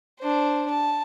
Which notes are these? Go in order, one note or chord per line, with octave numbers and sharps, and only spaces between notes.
D4 C5
A5